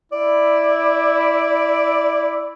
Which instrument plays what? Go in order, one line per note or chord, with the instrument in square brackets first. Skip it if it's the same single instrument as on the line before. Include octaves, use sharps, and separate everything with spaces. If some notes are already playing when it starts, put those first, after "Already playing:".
[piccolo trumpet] E4 [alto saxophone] D5